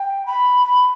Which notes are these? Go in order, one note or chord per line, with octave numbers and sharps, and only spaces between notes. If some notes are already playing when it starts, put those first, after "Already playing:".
Already playing: G5
B5
B5